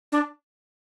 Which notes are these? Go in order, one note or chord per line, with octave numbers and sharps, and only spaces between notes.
D4